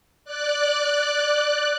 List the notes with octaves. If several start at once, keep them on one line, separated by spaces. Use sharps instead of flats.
D5 F#6